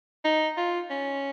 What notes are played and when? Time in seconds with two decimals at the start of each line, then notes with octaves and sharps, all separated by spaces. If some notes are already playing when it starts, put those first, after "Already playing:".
0.25 D#4
0.57 F4
0.90 C#4